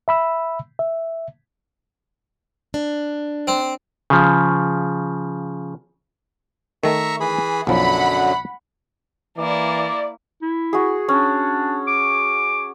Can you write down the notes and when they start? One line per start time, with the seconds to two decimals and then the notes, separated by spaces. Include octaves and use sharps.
0.08 E5 B5 E6
0.79 E5
2.74 D4
3.47 C4
4.10 C#3 F3
6.83 D#3 A3 E5 A#5 C#6
7.20 E3 G#4 B5
7.67 B1 F#2 D3 F3 F#3 F#5 B5
9.37 E3 A#3 E4 D5
10.42 E4
10.73 F#4 G#4
11.09 C#4 D4
11.87 D6